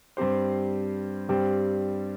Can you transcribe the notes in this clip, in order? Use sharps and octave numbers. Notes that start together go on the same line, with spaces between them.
G2 G3 C4 G4 C5
G2 G3 C4 G4